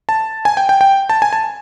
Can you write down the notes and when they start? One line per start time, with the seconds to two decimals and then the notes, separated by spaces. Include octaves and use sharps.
0.09 A5
0.45 G#5
0.57 G5
0.69 G5
0.81 G5
1.09 A5
1.22 G#5
1.33 A5